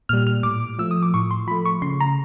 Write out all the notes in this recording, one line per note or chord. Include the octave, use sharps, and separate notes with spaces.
A#2 G3 F6
F6
A2 D6
F3 A3 E6
D#6
D6
A2 C#6
C6
F3 A3 B5
C#6
C#3 C6
A#5